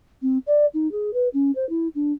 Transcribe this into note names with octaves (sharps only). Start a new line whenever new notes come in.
C4
D5
D#4
G#4
B4
C#4
C5
E4
D4